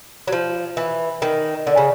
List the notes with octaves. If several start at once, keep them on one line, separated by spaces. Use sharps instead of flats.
F#3
F3
E3
D#3
D3
C#3